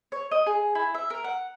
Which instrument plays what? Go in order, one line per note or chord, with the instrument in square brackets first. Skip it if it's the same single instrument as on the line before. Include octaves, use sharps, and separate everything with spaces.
[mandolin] C#5
D#5
G#4
E4
E5
A#4
F#5